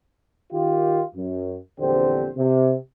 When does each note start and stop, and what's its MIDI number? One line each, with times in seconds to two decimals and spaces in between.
0.53 1.02 51
0.53 1.02 65
0.53 1.02 67
1.16 1.57 42
1.80 2.29 34
1.80 2.29 40
1.80 2.29 50
1.80 2.29 60
1.80 2.29 67
1.80 2.29 72
2.37 2.75 48